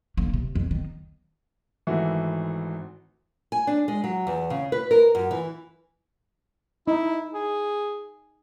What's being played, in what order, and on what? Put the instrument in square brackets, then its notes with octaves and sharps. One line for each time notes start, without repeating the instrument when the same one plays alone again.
[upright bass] D3 A#3
C3
F2
D#3
[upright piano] G#1 E3 A3 F#4
[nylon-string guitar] G#5
D4
G#3
F#3
E2
C#3
B4
A#4
F#2
E3
[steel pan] D#4 [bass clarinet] E4
[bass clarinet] G#4